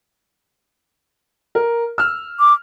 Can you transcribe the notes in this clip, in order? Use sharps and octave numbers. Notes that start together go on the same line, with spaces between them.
A#4
E6 F6
D6